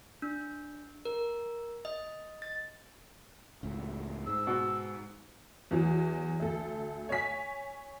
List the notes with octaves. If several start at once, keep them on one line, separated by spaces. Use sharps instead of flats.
D4
A#4
D#5
A6
C#2 A2
G#2 E6
B2
E2 E3 F#3
D2 A4
C#5 G#5 B6